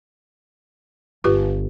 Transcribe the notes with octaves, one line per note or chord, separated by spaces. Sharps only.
G1 F4 G4 B4